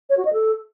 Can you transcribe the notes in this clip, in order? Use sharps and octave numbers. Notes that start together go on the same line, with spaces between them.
C#5
F#4
D#5
A4